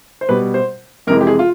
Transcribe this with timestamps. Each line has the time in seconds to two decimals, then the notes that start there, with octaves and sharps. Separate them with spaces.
0.21 C5
0.29 B2 G3 B4
0.54 C5
1.07 F2 C3 E3 G#3 A#4
1.21 G4
1.27 G#4
1.39 F4